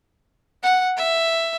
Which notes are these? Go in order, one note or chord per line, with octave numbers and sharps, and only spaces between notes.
F#5
E5